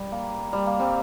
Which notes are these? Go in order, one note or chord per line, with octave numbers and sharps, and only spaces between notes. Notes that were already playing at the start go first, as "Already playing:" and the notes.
Already playing: G3
A#3
G3
A#3
G3 C4